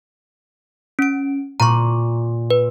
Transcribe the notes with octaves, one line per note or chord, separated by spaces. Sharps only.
C#4 D7
A#2 A#5 C#6
B4